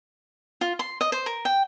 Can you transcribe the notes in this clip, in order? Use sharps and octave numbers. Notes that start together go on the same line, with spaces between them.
F4
C6
D#5
C5
A#4
G5